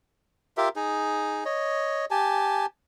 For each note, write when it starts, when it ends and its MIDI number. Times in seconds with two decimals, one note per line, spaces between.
0.57 0.69 65
0.57 0.69 67
0.57 0.69 70
0.57 0.69 76
0.76 1.44 63
0.76 1.44 68
1.45 2.05 73
1.45 2.05 75
2.11 2.66 67
2.11 2.66 80
2.11 2.66 81